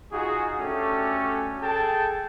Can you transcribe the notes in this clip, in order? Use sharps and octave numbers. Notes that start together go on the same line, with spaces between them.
D#4 F4 F#4 G#4
A3 C#4 D4 F#4 G4 A4
G#4 A4 G5 A5